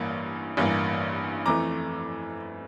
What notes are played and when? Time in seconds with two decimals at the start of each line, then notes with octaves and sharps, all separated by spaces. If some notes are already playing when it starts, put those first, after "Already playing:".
Already playing: A1 G2 E3 A#3
0.57 A1 G2 E3 A#3
1.46 F2 E3 A3 A#5 D6